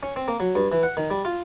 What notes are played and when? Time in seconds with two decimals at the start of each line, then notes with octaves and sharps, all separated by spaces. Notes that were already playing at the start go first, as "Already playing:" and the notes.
0.03 C#4
0.16 C4
0.28 A#3
0.40 F#3
0.55 G2
0.72 E3
0.83 F#5
0.97 D#3
1.10 G3
1.25 F4